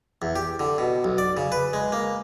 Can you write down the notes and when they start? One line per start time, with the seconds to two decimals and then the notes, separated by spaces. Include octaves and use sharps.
0.22 E2
0.36 G4
0.60 D3
0.78 B2
1.04 B1
1.18 D5
1.37 C#3
1.52 B4
1.73 G#3
1.92 A#3